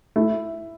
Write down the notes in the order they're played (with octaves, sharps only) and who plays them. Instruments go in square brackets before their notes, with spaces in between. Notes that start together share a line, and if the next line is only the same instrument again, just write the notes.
[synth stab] A3 [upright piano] E4